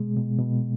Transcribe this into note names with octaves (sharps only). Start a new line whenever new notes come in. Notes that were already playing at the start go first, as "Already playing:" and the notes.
Already playing: B2 G#3
B2
B2